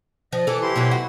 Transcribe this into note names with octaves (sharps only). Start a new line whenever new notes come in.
F3 D#5
E3 A4 A5 D6
E4 G4 C6
B2 E3 F#3
F#4